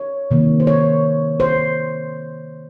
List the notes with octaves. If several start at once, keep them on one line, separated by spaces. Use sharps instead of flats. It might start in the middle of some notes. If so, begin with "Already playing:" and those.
Already playing: C#5
C3 D#3 A#3
C5
C#5
C5